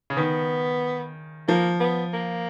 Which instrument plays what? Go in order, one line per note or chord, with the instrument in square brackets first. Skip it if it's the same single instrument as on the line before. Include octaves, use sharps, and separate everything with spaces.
[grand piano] C#3
[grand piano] D#3 [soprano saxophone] B3
[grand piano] F3 [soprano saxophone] A#3
[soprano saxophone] B3
A#3